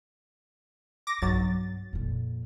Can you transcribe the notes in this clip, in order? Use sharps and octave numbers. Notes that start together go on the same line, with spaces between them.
D6 A#6
B1 G2 F#3 A6
F2 A#2